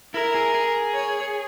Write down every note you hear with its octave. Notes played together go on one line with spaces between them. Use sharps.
E4 A#4
G#4
G#4
C#5